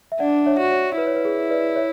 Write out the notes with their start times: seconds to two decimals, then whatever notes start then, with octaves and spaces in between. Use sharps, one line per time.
0.12 E5
0.19 D4 D5 F#5
0.46 C#5 E5
0.59 F#4
0.71 C#5
0.98 E4 B4
1.07 C#5
1.16 B4
1.25 G#4
1.50 B4 D5
1.76 C#5 E5